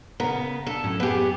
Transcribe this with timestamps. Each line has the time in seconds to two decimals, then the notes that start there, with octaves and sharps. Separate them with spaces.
0.20 C#3 B3 A#4
0.67 D4 A4
0.84 A2 F#3 C#4
1.00 F#2 B3 G4 G#4